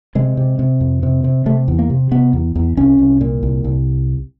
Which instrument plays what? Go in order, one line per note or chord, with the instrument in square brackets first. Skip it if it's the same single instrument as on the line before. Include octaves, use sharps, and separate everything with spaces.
[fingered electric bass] C3 G#3
C3
C3
F2
C3
C3
C3 A3
E2
A#3
C3
C3 B3
E2
E2
C2 C#4
C2
A#2
C2
C2